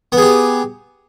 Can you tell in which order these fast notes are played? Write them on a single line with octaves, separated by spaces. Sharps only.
B3 G#4 G4